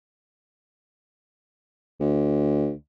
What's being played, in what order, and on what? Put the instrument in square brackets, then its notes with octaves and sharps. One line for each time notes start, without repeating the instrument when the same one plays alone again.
[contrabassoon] D2